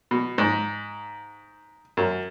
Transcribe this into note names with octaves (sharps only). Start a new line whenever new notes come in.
B2
G#2
F#2